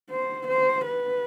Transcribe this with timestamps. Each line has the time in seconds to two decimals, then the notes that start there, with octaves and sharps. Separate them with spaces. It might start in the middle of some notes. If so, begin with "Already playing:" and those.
0.11 C5
0.48 C5
0.86 B4